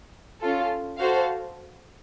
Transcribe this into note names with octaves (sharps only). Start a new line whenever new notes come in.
C#4 F4 A4
F#4 A4 C5 F5